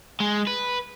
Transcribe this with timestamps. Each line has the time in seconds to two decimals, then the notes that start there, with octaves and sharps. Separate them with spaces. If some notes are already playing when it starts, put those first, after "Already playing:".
0.20 G#3
0.47 B4